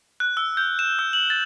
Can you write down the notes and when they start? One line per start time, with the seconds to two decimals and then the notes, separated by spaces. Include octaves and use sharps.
0.20 F#6
0.37 E6
0.57 G6
0.79 E7
0.99 E6
1.13 F#7
1.30 A6